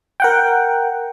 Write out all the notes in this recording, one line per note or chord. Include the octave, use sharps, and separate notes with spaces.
A#4 F#5 G5